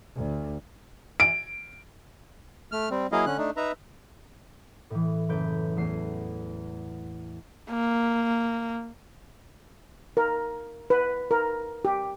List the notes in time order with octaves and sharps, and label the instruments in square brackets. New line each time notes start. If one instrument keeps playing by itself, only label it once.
[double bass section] D2
[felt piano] D7
[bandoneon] A3 F6
G3 C4
F#3 A#3 E4 G#4 D#5 F5
D3 C#4 F#6
A3 D4 D#4
D#4 B4 E5 A#5
[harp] A2 E3
F#1 A4 B4 G6 D7
E2 A3 C7
[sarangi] A#3
[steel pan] A#4
B4
A#4
G4